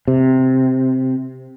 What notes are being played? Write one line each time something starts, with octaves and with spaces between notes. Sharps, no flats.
C3